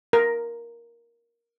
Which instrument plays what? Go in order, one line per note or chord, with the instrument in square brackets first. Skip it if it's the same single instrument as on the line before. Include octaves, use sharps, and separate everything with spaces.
[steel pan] A#4